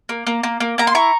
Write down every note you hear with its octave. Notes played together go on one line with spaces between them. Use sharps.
A#3
A#3
A#3
A#3
A#3 A#5
C6
E4 A#5 C#6